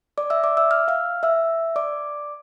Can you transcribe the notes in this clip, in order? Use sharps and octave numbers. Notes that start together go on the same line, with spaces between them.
D5 D6
E5 E6
D5 D6
E5 E6
F6
F5 F6
E5 E6
D5 D6